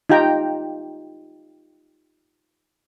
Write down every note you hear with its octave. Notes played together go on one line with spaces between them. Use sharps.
D#4 F4 G4 G5 A#5